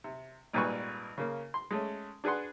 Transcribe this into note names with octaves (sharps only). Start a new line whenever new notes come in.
C3
G#1 A#2 G3 B4 G#5 C#6
C#3 A#3
C6
G#3 A3 C#4
D4 G#4 B4 F#5 C6